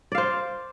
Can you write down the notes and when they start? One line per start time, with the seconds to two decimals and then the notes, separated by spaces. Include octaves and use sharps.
0.12 D5
0.15 F5
0.18 C5